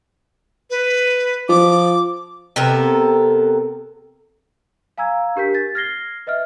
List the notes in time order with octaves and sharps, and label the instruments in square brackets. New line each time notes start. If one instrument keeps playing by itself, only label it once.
[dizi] B4
[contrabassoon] F3 [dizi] D6
[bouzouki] C3 B3 A4 A#4
[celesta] F5 G#5 A#5 E6 G#6
D4 G4 A#4 G6 B6
A6
F6 G#6 A#6 C7 G7
B4 D#5 E5 F6